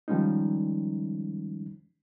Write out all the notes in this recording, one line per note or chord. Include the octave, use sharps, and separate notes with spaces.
D#3 F3 G3 G#3 C#4 D#4